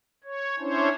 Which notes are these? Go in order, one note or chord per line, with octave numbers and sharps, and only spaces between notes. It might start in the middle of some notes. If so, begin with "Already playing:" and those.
C#5
C#4 D4 E4 C5 C#5